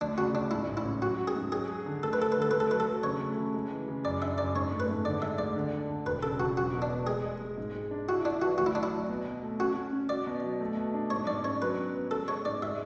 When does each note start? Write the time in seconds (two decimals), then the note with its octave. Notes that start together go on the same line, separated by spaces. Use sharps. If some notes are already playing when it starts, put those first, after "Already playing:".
0.01 D2 D4
0.18 C#3 F#4
0.34 D2 D4
0.51 G#2 E4
0.68 A1
0.77 E4
0.85 C#4
1.02 F#3 F#4
1.18 F#4
1.27 G#4
1.36 G#2
1.52 F#3 G#4
1.69 G#4
1.86 D3
2.03 A3 A4
2.13 B4
2.19 A3 A4
2.32 B4
2.37 D3
2.42 A4
2.51 A3 B4
2.60 A4
2.70 F#3 B4
2.80 A4
2.87 F#3
3.03 C#3 C#5
3.20 A3
3.37 C#3
3.54 G#3
3.71 E3
3.88 C#3
4.05 F#2 D5
4.22 D4 E5
4.38 F#2 D5
4.55 G#2 C#5
4.72 A3
4.80 B4
4.89 G#2
5.05 D3 D5
5.22 G#3 E5
5.38 D2 D5
5.56 D3
5.73 D3
5.90 D3
6.06 E1 B4
6.23 C#3 A4
6.40 E1 F#4
6.56 F#3 F#4
6.73 B2
6.82 D4
6.90 B3
7.07 G#3 G#4
7.24 G#3
7.41 G#3
7.58 G#2
7.74 G#3
7.91 D4
8.08 E4 F#4
8.25 D4 E4
8.42 E3 F#4
8.58 D2 F#4
8.66 E4
8.75 F#3 D4
8.83 E4
8.92 F#3
9.09 B2
9.25 B2
9.43 A3
9.60 C#4 F#4
9.76 C#4
9.93 C#4
10.09 F#4 D5
10.27 B2
10.44 F#3
10.61 A3
10.77 B2
10.94 D4
11.10 G#2 C#5
11.27 G#2 D5
11.44 C#4 C#5
11.61 F#3 B4
11.78 B3
11.95 B3
12.11 G#3 A4
12.28 G#3 C#5
12.45 G#2 D5
12.62 G#3 E5